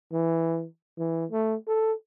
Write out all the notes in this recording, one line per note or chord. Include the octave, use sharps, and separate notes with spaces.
E3
E3
A3
A4